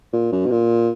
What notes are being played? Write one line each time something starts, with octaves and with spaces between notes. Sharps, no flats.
A#2
F#2
B2
A#2